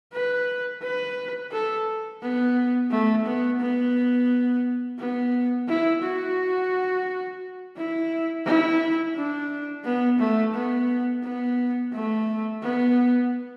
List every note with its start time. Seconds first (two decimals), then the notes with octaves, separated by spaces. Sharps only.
0.13 B4
0.82 B4
1.52 A4
2.22 B3
2.91 A3
3.26 B3
3.60 B3
4.99 B3
5.69 E4
6.03 F#4
7.77 E4
8.46 E4
9.16 D4
9.85 B3
10.20 A3
10.54 B3
11.23 B3
11.93 A3
12.62 B3